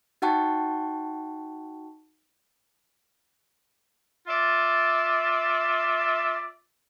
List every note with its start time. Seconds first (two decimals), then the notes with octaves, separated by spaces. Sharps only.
0.22 D#4 F#4 F#5 G5 A5 C#6
4.27 F4 D5 E5